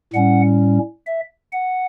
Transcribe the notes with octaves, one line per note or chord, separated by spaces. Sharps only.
A2 G3 C#4 F#5
E5
F#5